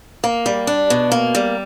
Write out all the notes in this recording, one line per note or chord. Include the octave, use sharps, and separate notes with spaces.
A#3
G3
D4
B2
A#3
G3